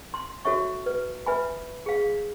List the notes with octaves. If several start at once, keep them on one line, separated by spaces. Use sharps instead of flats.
C6
F#4 A4 C#5 E5 C#6
B4
B4 E5 G#5 B5
G#4 F5